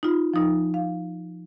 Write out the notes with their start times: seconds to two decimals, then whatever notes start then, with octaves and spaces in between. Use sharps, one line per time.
0.03 D#4 F4
0.34 F3 D#4
0.74 F5